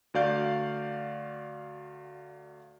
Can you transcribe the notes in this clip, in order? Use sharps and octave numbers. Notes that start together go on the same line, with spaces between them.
D2 F#4 D5 F5 G6 D7